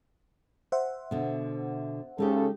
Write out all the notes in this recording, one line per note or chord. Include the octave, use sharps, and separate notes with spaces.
C5 E5 F#5
B2 D3
C#3 G#3 D#4 G4 A4